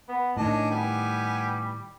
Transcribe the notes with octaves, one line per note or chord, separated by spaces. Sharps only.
B3
A2 D#3 C#4 D4 D#5 A5
G3 B3 G4 G#5